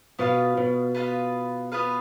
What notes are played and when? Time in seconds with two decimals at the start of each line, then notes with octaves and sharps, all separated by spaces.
0.19 B2 B3 F4 B4 F5
0.57 B2
0.95 B3 F4 B4 F5
1.72 B3 F4 B4 F5